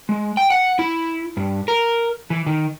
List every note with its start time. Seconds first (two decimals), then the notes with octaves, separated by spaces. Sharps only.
0.09 G#3
0.37 G5
0.50 F#5
0.79 E4
1.37 G2
1.68 A#4
2.30 E3
2.46 D#3